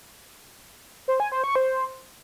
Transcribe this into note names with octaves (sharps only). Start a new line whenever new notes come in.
C5
G#5
C5
C#6
C5